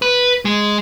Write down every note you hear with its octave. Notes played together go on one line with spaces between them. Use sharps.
B4
G#3